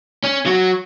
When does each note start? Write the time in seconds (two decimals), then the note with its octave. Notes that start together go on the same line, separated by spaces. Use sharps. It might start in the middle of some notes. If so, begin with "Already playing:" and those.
0.24 C#4
0.46 F#3 F#4